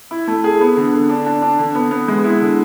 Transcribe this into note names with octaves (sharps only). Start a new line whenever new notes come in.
E4
A3
G#4
B3
D3
D3
D4
D4
D4
D3
B3
B3
G#3
E4
D3